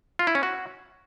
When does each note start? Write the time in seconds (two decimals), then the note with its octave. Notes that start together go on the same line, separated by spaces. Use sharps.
0.19 F4
0.27 E4
0.35 C#4
0.43 F#4